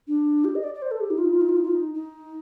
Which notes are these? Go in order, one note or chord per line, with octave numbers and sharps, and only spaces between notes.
D4
G4
D#5
D5
D5
C5
A4
G4
D#4
F4
D#4
F4
D#4
F4
D#4
F4
D#4
D#4